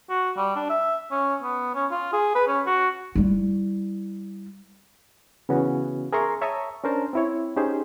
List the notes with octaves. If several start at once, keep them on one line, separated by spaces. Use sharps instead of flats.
F#4
G3
D4
E5
C#4
B3
C#4
F4
G#4
B4
C#4
F#4
G3 E4
C#3 E3 B3 C#4 F#4
G#4 A#4 E5 A#5 C6 C#6
C#5 E5 A5 A#5 C#6 D#6
C#4 D4 A#4 C5 A5
C4 E4 C#5
C#4 D#4 G4 G#4 C5